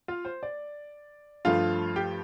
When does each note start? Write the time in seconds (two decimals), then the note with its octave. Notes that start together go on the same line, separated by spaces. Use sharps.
0.08 F4 F5
0.25 C5
0.43 D5
1.45 G2 F3 A3 F4 F5
1.96 G4 G5